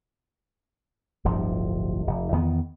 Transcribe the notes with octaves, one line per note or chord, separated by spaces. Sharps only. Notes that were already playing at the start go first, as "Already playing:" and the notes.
D1 G1 G2 F3
F1
E2 D#3 B3